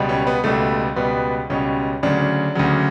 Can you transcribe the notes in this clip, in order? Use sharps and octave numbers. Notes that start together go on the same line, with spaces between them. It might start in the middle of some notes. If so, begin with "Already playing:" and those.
Already playing: C#2 B2 G3
C#4
B3
C#2 B2 G3 A3
C#2 B2 G3 B3
C#2 B2 G3 C#4
D2 C#3 F#3 D4
D2 C#3 F#3